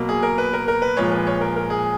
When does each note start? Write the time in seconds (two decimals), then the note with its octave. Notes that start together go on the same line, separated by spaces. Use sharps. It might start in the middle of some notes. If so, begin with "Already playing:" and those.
Already playing: B2 F#3 A#3
0.09 G#4
0.23 A#4
0.38 B4
0.53 A#4
0.68 A#4
0.82 B4
0.97 A#2 F3 G#3 C#5
1.12 B4
1.27 C#5
1.41 A#4
1.56 A#4
1.70 G#4